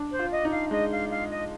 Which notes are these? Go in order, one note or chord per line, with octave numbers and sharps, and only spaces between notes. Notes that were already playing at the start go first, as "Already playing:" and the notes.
Already playing: D4
C5
F4
D#5
D#4
F5
G#3 D#5
F5
F5
D#5